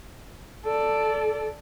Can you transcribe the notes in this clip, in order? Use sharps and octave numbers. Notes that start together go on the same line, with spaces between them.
A4 D5